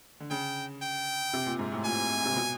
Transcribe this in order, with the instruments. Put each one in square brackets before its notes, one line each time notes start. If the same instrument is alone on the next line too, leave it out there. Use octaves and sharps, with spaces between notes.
[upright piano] D3
[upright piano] C#3 [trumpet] G5
[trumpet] G5
[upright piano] C3
A#2
G#2
A2
[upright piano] A#2 [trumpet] G#5
[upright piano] C3
B2